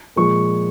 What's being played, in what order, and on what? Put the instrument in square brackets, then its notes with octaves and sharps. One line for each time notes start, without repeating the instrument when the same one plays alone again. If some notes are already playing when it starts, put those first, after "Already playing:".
[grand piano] A#2 F3 G#3 C#6